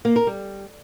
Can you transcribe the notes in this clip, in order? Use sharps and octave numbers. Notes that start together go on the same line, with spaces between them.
A#3
A#4
G3